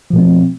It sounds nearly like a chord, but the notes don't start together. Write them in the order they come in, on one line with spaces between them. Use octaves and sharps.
F3 B2 A3 C4